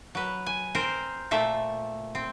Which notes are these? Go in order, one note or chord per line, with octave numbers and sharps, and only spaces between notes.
F#3 B4
G#5
C4 A#4 C5
A#2 A3 E5
C4